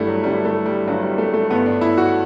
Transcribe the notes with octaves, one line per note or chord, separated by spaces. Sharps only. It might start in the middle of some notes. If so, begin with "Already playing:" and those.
Already playing: G1 G2 D3 G3 A3 E4
F#3
G1 G2 D3 G3
A3
G3
G1 G2 D3 F#3
G3
A3
A3
G1 G2 D3 B3
D4
E4
F#4